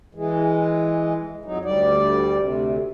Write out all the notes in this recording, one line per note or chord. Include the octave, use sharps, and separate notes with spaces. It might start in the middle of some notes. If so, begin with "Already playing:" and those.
E3 G#3
F2 F#3 D#4
D2 G3 D5
D2 C3